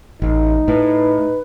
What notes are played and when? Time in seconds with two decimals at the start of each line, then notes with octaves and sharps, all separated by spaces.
0.22 A1 D#4
0.68 A2 B4